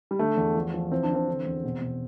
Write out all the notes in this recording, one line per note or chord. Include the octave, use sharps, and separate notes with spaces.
G3
D3 A3
E2
F3
F3
E3 C4
D4
E3 C4
D3
E2
B2
B2